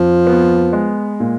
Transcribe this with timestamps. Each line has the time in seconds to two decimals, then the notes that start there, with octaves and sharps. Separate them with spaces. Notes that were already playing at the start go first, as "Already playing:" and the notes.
Already playing: F2 F3
0.27 B3
0.73 G#3
1.20 A#2